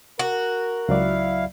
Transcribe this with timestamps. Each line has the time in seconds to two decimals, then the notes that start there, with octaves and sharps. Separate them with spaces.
0.19 F#4 A#4
0.89 C#2 F#3 E4 D5 F5